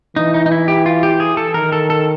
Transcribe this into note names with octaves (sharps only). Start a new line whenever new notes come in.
E3 D#4
D#4
D#4
E4
G4
F4
G4
G#4
A4
D#3 A#4
A4
A4